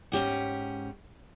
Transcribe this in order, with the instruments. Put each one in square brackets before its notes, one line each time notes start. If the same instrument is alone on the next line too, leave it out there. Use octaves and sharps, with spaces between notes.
[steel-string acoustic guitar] G#2 C#4 G4 F#5